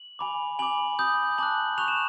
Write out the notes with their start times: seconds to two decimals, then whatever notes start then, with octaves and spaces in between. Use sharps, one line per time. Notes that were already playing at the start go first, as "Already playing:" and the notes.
Already playing: F#7
0.19 G#5 B5 D6
0.59 G#5 B5 D6 F#7
0.99 B5 D#6 G6
1.38 A5 D6 F#6 F#7
1.78 C#6 F#6 F7
1.88 E7